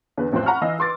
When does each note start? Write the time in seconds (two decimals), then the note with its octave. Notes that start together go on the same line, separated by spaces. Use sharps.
0.17 E2 D3 B4
0.32 A1 F2 C4 C5 F#6
0.46 F#5 A#5 B5 C#6 F6
0.61 E3 D#5 F5 E6
0.79 B4 C6 D6 A6